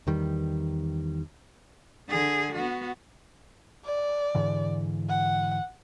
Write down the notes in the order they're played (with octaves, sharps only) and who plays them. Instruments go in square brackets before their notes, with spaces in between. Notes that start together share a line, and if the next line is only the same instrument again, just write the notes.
[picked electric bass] E2 D#3 G3
[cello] D3 G#4
B3 F#4
[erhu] D5
[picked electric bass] G#2 D3 E3
[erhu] F#5